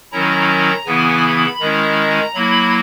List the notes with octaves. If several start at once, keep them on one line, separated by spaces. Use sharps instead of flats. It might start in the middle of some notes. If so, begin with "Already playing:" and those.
D#3 F#3 C#4 E4 A#5
A#5
C#3 E3 B3 E4 G#5
B5
D#3 G#3 C#4 E4 A#5
F#3 A#3 E4 B5